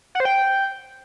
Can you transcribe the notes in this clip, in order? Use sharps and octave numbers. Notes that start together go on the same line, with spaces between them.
F#5
C5
G5